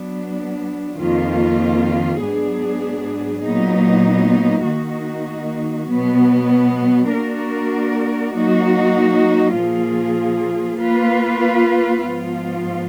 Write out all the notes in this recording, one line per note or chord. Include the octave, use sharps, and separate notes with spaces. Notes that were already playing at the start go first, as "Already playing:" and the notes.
Already playing: F#3 B3 D4
F2 D#3 A#3 F4
G#2 F#3 B3 D4 G#4
A#2 F#3 B3 D#4
D#3 A#3 D#4 F#4
B2 F#3 B3
A#3 D4 F#4 A#4 D5
F#3 A#3 D#4 F#4
A#2 F3 A#3 F4 G#4
A#3 F4 B4
G#2 F3 B3 F4